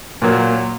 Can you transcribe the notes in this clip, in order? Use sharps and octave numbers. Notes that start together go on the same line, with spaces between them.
A#2 F#3 A#3